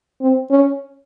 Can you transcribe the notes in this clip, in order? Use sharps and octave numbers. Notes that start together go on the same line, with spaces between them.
C4
C#4